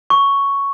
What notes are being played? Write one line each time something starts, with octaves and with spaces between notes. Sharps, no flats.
C#6